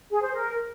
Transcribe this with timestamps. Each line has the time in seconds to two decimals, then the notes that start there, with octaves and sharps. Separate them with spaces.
0.10 G#4
0.21 C5
0.33 A#4